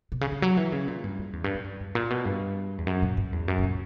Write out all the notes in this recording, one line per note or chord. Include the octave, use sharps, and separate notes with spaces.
B2
C#3
D3
F#3
E3
C#3
A#2
G2
F#2
E2
G2
B2
G2
F#2
A#2
B2
G2
E2
F#2
A#2
G2
E2
F#2
B2
A#2